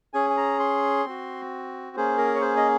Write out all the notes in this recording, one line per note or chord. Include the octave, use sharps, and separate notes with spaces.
C#4 G#4 G#5
G#5
A#5
C6
C4 F#4
A#3 C#4 G#4 C5
A#4
C#5
C5
D#5